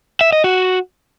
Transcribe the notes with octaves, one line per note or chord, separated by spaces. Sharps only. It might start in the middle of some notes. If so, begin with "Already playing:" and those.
E5
D#5
F#4